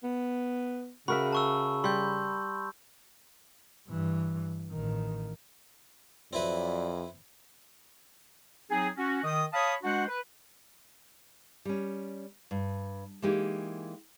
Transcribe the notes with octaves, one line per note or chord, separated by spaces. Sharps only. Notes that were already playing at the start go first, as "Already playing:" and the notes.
B3
C#3 F#4 A#4 E5 B5
A5 C#6 E6
G3 C6 G6
G2 E3
A1 D#3
F2 F#3 C4 E4 B4 D5
F#3 C4 D#4 G#4
C#4 F#4
D#3 D#5 D#6
C#5 F5 A5 B5 D#6
G#3 D4 F#4 C5 F#5
B4
G3 C#4
G2
E3 G#3 A#3 D#4 G4